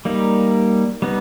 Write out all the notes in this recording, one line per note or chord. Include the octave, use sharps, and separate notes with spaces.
G3 A#3 D#4
G3 B3 D#4